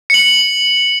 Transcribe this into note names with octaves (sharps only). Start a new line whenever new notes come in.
C#7 F#7